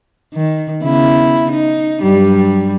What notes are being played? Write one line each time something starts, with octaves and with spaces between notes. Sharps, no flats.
D#3
C#3 B3 E4
D#4
G2 F#3 G3